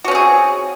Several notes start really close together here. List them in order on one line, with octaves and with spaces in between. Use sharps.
F#4 C#4 C4 G#4